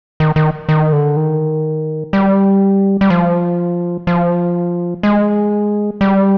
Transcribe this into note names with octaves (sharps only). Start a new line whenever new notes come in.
D#3
D#3
D#3
D3
D#3
G3
G3
F3
F3
G#3
G3